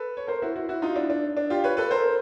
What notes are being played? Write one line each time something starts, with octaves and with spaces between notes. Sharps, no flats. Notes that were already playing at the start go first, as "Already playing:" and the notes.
Already playing: A4 B4
C#5
A#4 C5
E4 F#4
E4 F#4
E4 F#4
D#4 F4
D4 E4
D4
D4
F4 G4
B4 C#5
A4 B4
A#4 C5